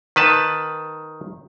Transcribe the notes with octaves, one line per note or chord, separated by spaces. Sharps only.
D#3 B4 A5